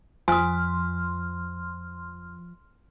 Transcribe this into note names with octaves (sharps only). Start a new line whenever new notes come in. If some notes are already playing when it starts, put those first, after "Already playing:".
F2 F3 G#5 C6 D#6 F6